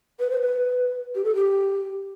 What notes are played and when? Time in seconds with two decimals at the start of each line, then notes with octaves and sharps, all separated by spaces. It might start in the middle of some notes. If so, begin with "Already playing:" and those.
0.20 B4
0.30 C5
0.41 B4
1.15 G4
1.24 A4
1.35 G4